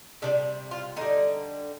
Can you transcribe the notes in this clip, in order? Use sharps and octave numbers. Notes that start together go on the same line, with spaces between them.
C3 D#3 G3 D4
F4
D3 G3 D#4